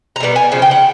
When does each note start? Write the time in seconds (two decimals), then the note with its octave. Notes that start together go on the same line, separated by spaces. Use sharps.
0.16 A#5
0.20 B2 G3 B3
0.36 G#5
0.52 C#3 F3
0.62 G5
0.71 F#5